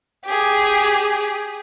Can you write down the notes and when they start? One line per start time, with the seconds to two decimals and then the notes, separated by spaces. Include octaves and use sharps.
0.25 G4 G#4